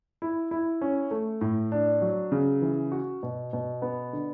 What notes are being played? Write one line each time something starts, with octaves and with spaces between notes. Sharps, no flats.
E4
E4
C#4
A3
A2
D4
F#3
C#3
E3
F#4
B2
B2
B3
D3